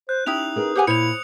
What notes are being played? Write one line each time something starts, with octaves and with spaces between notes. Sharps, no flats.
C5 F#6
C#4 D#4 E4 G4 D#6 F7
G#4 A#4 B4
G4 C5 F#5 G#5
A#2 E4 C5 C#5 C#7 F7